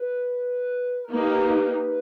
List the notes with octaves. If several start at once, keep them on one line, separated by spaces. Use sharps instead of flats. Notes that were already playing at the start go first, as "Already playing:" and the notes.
Already playing: B4
A#4
A#3 D#4 G4 B4